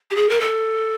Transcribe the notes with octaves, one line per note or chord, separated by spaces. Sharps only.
G4
G#4
A#4
A4